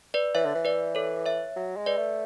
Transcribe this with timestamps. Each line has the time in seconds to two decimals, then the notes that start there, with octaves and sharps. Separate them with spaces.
0.14 B4 D5
0.35 E3 C#5 E5
0.45 D3
0.55 E3
0.65 B4 D5
0.95 A4 C#5
1.26 C#5 E5
1.56 F#3
1.77 G#3
1.86 B4 D5
1.97 A3